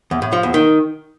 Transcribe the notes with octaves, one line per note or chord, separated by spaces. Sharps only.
E2
A2
F3
E2
D#3